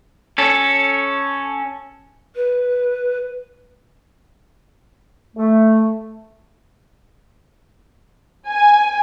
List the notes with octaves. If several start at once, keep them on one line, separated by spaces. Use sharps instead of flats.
C#4 A4
B4
A3
G#5